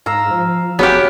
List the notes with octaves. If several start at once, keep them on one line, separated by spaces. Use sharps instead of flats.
G#2 F5 A#5 E6
F3
F1 F#3 B3 G4 G#4 F5